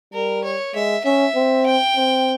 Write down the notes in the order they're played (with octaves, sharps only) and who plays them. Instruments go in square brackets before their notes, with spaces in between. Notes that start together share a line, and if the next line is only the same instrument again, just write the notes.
[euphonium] G3 [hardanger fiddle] A#4
[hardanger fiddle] C#5
[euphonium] G#3 [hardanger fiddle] E5
[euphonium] C#4 [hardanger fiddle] E5
[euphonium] C4
[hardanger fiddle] G5
[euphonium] C4